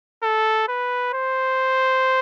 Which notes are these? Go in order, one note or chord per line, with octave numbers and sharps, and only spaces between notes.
A4
B4
C5